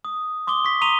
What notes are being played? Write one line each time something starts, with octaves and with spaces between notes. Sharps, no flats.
D#6
C6 D6 D#6 G7
C#6 B6
A#5 C6 D#6 D#7 F7 G7